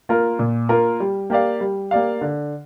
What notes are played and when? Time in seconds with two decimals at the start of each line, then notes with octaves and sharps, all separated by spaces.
0.09 A#3 F4 A#4
0.39 A#2
0.69 A#3 F4 A#4
1.00 G3
1.30 A#3 G4 D5 F5
1.60 G3
1.91 A#3 G4 D5 F5
2.21 D3